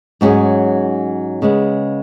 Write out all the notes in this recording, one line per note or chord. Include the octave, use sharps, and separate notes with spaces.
G#2 F#3 C#4 G#4
C#3 G#3 B3